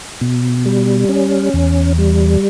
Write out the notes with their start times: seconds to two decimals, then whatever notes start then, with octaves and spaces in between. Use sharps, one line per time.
0.21 B2
0.66 G3
1.09 C#4
1.54 E2
1.98 G3